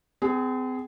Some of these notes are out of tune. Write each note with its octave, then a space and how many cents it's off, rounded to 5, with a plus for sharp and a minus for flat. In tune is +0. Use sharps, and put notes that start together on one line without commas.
C4 -40 G#4 +0